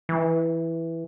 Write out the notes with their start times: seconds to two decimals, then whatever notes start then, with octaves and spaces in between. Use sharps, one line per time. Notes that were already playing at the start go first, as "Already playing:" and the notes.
0.09 E3